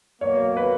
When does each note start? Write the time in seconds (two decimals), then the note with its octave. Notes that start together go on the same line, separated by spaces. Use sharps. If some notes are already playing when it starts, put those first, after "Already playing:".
0.21 B2 F#3 A#3 C#5
0.57 B4